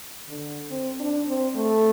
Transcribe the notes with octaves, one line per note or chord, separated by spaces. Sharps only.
D3
C4
D4
C4
A3